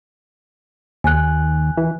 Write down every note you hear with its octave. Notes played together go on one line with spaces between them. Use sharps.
D#2 G#5 F#6
E3